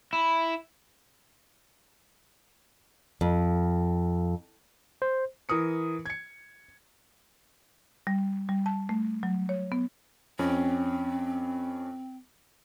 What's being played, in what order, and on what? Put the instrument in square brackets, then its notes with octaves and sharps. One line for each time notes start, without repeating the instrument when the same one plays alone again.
[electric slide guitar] E4
[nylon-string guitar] F2
[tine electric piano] C5
[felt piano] E3 A#4 D#6 C#7
G#6 C#7
[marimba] G3
G3
A5
A3
F#3
C#5
B3
[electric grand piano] F2 C#4 [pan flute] C4